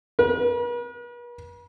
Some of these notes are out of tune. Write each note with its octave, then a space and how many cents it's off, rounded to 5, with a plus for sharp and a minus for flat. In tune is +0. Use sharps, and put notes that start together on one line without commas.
B4 -45